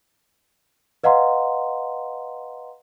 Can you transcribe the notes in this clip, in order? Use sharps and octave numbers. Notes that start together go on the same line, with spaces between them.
B4 D#5 F5 F#5 A#5 C6